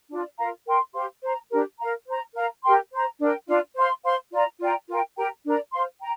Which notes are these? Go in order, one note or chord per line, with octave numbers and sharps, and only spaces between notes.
D4 F4 D5
F4 A#4 F5 A#5
A#4 G5 C6
G4 C5 F5 C6
C5 A#5
D4 G4 A#4
A#4 F5 A#5
C5 A#5
A#4 F5 A#5
G4 A#4 G5 C6
C5 A#5
D4 A#4 G5
D4 F4 D5 F5
C5 F5 C6
C5 F5 C6
F4 D5 A#5
F4 D5 G5 A#5
F4 A#4 G5
G4 A#4 G5 A#5
D4 A#4 D5 A#5
C5 F5 C6
G5 A#5